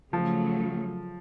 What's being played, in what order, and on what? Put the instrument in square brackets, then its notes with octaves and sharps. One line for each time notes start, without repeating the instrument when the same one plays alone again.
[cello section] C#3 F#3 A3 [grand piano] F3